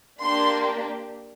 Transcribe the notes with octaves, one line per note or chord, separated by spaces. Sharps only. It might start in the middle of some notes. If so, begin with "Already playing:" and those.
A#3 D4 G4 C6